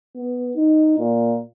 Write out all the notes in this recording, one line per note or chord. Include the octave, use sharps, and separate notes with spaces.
B3
D#4
A#2